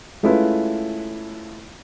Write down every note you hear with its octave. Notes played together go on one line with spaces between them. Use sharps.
G#3 A3 C#4 E4 F4 B4